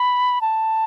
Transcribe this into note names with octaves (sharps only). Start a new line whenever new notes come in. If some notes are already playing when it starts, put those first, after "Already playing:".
Already playing: B5
A5